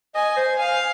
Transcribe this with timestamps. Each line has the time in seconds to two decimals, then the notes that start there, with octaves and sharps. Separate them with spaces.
0.15 D#5 G#5
0.36 C5
0.59 F5 G#5